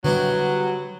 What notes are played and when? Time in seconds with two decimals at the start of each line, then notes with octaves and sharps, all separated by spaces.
0.05 D3 F#3 G3 B3 E4 G4